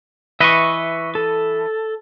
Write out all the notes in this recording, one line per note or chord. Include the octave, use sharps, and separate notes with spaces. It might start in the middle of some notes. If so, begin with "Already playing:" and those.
E3 B4 D#5 E5 C#6
A4